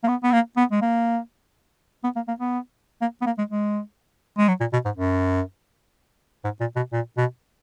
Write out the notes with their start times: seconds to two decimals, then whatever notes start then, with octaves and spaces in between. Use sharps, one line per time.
0.04 A#3
0.08 B3
0.24 B3
0.32 A#3
0.57 B3
0.72 G#3
0.82 A#3
2.04 B3
2.16 A#3
2.28 A#3
2.40 B3
3.02 A#3
3.22 B3
3.26 A#3
3.38 G#3
3.51 G#3
4.38 G#3
4.48 F#3
4.60 A#2
4.73 B2
4.85 G#2
4.97 F#2
6.44 G#2
6.61 A#2
6.76 B2
6.93 A#2
7.17 B2